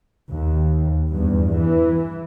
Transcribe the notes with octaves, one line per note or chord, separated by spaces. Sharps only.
D#2
E2 G2
E3